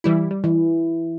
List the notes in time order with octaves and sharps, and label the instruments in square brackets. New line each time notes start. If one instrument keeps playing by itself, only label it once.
[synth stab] E3 G3 E4
G3
[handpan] E3